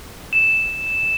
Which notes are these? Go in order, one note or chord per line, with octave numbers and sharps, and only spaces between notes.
E7